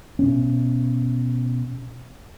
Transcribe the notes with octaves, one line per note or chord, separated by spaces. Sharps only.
B2 C#4